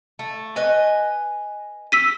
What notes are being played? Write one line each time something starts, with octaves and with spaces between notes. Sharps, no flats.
A3
B4 D#5 G#5
E6 B6 D#7